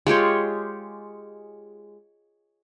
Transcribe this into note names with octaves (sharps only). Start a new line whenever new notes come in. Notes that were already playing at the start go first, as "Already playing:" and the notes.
G#3 F4 G4 C#5